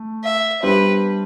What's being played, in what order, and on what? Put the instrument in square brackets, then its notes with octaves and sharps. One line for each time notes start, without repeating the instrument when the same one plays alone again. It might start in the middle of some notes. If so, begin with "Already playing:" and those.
Already playing: [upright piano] A3
[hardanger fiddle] E5
[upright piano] G3 B3 D4 G4 C5 [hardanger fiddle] B4